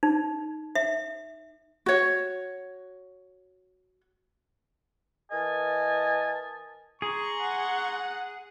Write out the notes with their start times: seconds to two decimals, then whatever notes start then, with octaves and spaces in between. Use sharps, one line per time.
0.03 D#4
0.75 E5
1.86 F#4 C#5
5.31 E3 A#4 D#5 G#5 A5
7.02 G#4 A#5 C6 C#6
7.42 F#5